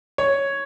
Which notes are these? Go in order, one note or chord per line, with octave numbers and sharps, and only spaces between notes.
C#5